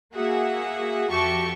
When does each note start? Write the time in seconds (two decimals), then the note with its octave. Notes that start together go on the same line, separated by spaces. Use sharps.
0.14 A#3 F#4 G#4 E5 F#5
1.10 F2 F#4 G4 E5 A5 C#6